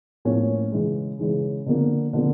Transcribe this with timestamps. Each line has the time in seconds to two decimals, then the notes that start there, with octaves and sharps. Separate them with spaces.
0.25 A2 F3 A#3 C#4
0.72 C#3 E3 G#3
1.19 C#3 E3 G#3
1.66 D3 F3 A#3
2.13 D3 F3 A#3